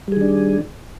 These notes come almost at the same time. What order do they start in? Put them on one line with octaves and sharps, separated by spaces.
G3 G#4 D#3 D4